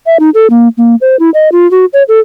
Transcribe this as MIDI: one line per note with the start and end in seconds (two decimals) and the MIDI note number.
0.06 0.17 76
0.19 0.30 63
0.34 0.49 69
0.50 0.68 58
0.77 0.95 58
1.01 1.16 72
1.19 1.30 64
1.34 1.51 75
1.52 1.69 65
1.71 1.85 66
1.93 2.03 73
2.08 2.20 69